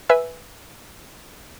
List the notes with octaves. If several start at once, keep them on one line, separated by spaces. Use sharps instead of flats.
B4 E5 G#5 E6